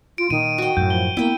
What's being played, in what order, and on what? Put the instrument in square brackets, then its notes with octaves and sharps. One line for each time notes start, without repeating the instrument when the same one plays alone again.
[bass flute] F4 [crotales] D7
[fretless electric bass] A#2 [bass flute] D#3 [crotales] D#7
[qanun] F#4 G5
[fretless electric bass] F#2 A2 [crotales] G6
[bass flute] F3 [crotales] G7
[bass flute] A#3 [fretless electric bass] B3 [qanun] E4 G5